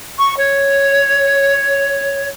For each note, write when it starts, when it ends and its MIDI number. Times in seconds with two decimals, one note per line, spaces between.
0.19 0.37 85
0.37 2.29 73